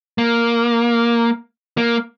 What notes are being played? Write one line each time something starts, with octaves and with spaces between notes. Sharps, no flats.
A#3
A#3